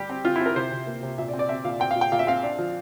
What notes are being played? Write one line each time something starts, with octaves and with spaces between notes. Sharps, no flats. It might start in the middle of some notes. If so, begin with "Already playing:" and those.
Already playing: G3 G4
C4
C4 F4
E4
C4
A#4
C3 C5
C3
A#3
C3
A#2 E5
D5
C4
D5
C4 E5
A#2 F5
C4 G5
A#2 F5
G5
A#2 F5
E5
C4 F5
D4
F3